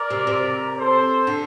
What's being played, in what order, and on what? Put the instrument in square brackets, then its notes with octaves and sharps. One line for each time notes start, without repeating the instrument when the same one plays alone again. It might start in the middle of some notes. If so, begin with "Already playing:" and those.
Already playing: [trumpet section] A#4 D5
[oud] C3
C3
[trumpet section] A4 C5
[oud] D3